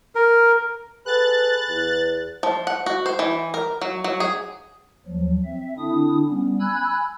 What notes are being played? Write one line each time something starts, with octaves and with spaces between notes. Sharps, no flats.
A#4
G#4 A4 B4 F#6 A6
E2
F3
F#5
F#4
C5
E3
A#4
F#3
F#3
G#4
D#2 F3 F#3
C4 E5
D3 C4 D4 E4 D#6
G3 B3 C#4
G#5 B5 E6 F#6 G#6